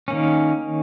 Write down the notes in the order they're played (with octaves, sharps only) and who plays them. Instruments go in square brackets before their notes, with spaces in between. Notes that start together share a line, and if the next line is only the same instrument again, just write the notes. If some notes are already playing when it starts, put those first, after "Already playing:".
[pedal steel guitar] D#3 A#3 C#4